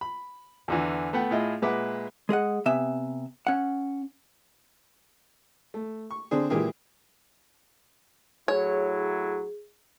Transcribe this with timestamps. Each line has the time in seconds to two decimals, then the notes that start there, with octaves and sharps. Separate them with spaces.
0.01 B5
0.68 E2 D3 E3
1.13 A3 B3 F#5 G5
1.31 A2 E4 F4 G#4 D#5 E5
1.62 A#2 G#3 B4 E5 F#5 D6
2.29 G#3 G#4 D#5 F#5
2.66 C3 B3 E5 G#5
3.47 C#4 F#5
5.74 A3
6.11 C#6
6.31 D3 C4 D4 G#4
6.50 A#2 E3 G#3 A#3 G4 G#4
8.48 A2 F#3 E4 G#4 C#5